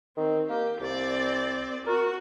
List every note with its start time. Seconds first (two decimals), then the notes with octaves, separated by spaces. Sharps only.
0.17 D#3 C4
0.49 A#3 G4
0.81 C2 C4 D5
1.86 F#4 A#4